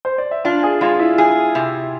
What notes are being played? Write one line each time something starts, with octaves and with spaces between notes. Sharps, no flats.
C5
D5
E5
D4 F4 F5
G#4 G#5
G#3 F4 F5
E4 E5
G#4
C3